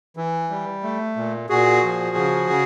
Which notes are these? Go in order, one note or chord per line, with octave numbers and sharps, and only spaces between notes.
E3
G3
A3
A#2
A#2 F#4 G#4
F3
C#3
C#3